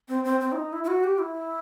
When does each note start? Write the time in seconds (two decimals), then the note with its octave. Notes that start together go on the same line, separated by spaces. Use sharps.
0.09 C4
0.24 C4
0.40 C4
0.52 E4
0.56 D#4
0.73 E4
0.84 E4
0.88 F#4
1.04 G4
1.20 E4